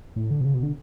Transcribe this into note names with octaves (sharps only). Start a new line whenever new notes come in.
A2
D3
B2
C#3
B2
D3